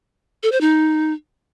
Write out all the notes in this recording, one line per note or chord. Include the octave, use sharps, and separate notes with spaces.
A4
C5
D#4